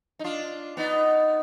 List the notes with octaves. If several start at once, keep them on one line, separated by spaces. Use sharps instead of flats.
D#4
D4 F4
B3 D#4